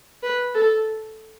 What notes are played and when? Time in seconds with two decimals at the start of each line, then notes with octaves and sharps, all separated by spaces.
0.23 B4
0.54 A4